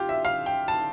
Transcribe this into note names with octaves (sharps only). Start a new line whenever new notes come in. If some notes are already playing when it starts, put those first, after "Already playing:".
Already playing: F4 G4
E5
F5
G5
A5